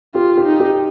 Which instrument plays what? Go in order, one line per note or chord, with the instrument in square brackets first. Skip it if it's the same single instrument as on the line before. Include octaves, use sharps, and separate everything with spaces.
[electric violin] F4 [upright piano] G4
[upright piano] G4
[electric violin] D#4
[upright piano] G4